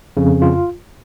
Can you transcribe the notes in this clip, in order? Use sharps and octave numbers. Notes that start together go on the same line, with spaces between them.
F2 C#3
F4